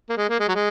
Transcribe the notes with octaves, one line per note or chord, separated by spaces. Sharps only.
A#3
G#3
A#3
G#3
F#3
G#3